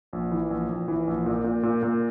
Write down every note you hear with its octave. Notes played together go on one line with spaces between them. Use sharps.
A#1
E3
A#1
A#1
E3
A#1
A#2
A#2
A#2
A#2